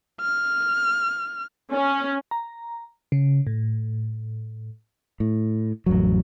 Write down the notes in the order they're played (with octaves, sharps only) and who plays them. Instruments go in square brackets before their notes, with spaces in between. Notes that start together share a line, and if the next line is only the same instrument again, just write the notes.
[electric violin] F6
[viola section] C#4
[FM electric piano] A#5
C#3
A2
[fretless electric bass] A2
A1 F2 F#3